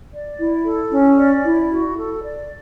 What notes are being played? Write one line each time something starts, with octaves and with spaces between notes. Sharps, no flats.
D5
E4
A4
C#4
D5
E4
F#4
A4
D5